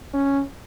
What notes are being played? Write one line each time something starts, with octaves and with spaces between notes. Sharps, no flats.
C#4